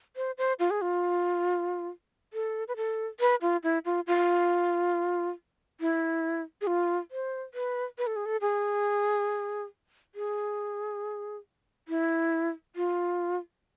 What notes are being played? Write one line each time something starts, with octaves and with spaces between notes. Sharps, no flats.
C5
C5
F4
G#4
F4
A4
B4
A4
B4
F4
E4
F4
F4
E4
G#4
F4
C5
B4
B4
A4
G#4
A4
G#4
G#4
E4
F4